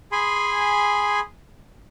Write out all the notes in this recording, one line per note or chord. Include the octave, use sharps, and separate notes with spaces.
G#4 G#5 B5 C6